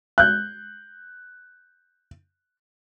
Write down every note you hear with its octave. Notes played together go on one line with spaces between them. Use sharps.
F#6 G6